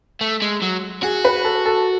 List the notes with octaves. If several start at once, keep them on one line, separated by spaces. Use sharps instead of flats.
A3
G#3
F#3
F#4 G#4
B4
A4
A4